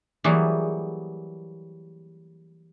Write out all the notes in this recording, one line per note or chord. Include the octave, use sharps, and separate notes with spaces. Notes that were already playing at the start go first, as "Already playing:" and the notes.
E3 F#3 G3 A#3 G#4